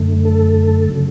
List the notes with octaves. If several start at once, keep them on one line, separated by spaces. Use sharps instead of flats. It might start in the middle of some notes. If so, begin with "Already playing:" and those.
Already playing: F#2 D3 A3
A4
C#3 F#3